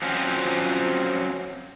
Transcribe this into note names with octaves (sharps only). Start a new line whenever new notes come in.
F3 F#3 C4 C#4 F4